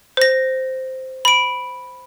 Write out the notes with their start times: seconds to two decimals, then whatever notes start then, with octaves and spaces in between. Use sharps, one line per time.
0.17 C5 A#6
1.25 B5 D7